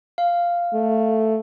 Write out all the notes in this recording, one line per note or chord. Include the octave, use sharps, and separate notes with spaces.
F5
A3